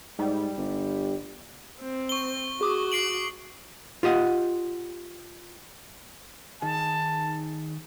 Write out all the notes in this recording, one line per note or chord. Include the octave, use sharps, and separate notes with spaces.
G#2 G3
G1
C4
C#6 G7
F#4 G#4 D6 D#6
C7 D7 F#7
F4 G4 D#5 F#5
D#3 D#4 G#4 A5